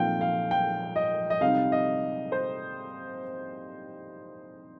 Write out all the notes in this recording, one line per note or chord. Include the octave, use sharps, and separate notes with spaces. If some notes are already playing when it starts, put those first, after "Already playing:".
Already playing: A#2 F3 C4 D#4 F5 G5
F5
G5
D#5
D#5
C3 G3 C4 D#4 F5
D#5
C5